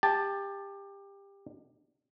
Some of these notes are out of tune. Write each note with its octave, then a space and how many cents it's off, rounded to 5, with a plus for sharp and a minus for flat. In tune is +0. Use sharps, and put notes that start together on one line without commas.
G4 +20 A5 +0